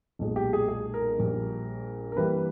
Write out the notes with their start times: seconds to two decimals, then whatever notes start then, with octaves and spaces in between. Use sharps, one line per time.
0.19 B1 A#2 G#3
0.36 G4
0.53 G#4
0.68 G#4
0.94 A#4
1.19 A#1 A#2 G3
2.12 A#4
2.16 G2 E3 G3 A#3 B4